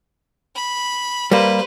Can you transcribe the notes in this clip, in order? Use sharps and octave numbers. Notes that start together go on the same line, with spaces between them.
B5
G3 A#3 B4 C5